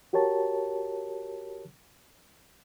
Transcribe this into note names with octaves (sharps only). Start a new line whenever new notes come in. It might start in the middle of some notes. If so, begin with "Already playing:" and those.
F#4 G4 A#4 C#5 A5